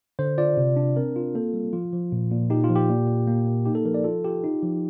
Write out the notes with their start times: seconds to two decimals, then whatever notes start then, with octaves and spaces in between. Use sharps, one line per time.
0.19 D3 C5
0.38 F4 D5
0.57 C3
0.76 D4
0.96 C4 A#4
1.16 F4
1.35 A#3 A4
1.54 G3
1.73 F3 F4
1.93 F3
2.12 A#2
2.32 A#2
2.50 D#4 G4
2.64 F4
2.69 F3
2.76 G4
2.89 A#2
3.08 A#2
3.28 A#3
3.47 A#3
3.66 D#4 G4
3.75 A4
3.85 F3 A#4
3.94 D5
4.04 F4 A4
4.24 F4 G4
4.44 D#4
4.63 F3